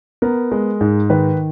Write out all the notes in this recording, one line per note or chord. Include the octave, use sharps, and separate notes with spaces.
B3 A#4
G#3
G#2
D#3 B4